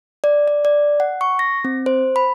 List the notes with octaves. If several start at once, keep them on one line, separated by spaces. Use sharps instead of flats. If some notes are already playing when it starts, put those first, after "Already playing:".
D5
D5
D5
F#5
C#6
A#6
C4
C5
B5